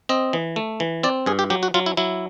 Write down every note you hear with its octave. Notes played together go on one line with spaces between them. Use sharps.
C4 D#5
E3
A3
E3
C4 D5
G2 G#4
G4
F#3 G4
F#4
F#3 F4
E4
F#3 E4